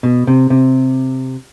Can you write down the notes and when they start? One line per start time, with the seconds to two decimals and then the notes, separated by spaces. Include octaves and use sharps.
0.03 B2
0.27 C3
0.50 C3